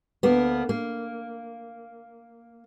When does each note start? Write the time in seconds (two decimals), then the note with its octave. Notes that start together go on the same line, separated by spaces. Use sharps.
0.23 D2 A#3 B3
0.69 A#3